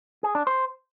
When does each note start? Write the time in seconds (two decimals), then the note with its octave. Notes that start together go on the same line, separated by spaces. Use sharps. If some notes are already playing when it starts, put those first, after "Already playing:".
0.23 G#4
0.35 D4
0.47 C5